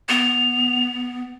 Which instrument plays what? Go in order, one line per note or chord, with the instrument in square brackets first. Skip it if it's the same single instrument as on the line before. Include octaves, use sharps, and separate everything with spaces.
[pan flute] B3 [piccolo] F7